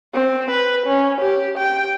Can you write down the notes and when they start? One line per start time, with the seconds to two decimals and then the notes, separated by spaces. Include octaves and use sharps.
0.14 C4
0.51 B4
0.87 C#4
1.21 G4
1.58 G5